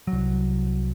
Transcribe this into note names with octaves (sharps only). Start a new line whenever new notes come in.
C2 F#3